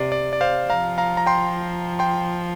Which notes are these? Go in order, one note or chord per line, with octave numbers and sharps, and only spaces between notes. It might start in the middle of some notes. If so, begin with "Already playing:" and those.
Already playing: C3 D5
D5
D5
C5 F5
F3 F5 A#5
F5 A#5
A#5
G5 C6
G5 C6